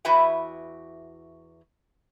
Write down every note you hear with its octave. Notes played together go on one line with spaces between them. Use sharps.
E2 E4 F#4 B4 E5 G5